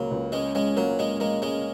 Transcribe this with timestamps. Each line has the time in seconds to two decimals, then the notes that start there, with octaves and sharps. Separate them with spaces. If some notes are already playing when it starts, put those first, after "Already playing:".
Already playing: C#2 C#3 F#3 A#3
0.11 C#2
0.32 G#3 C#4
0.55 G#3 C#4
0.76 F#3 A#3
0.98 G#3 C#4
1.20 G#3 A#3
1.42 G#3 C#4